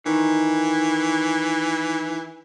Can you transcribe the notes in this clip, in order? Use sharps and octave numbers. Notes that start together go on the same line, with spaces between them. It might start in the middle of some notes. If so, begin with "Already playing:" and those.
D#3 E3